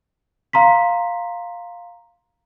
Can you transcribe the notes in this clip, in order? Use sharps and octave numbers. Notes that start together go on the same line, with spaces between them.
F5 A#5 C6 B6